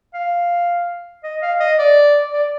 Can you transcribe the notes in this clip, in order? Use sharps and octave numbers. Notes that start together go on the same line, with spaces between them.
F5
D#5
F5
D#5
D5
D5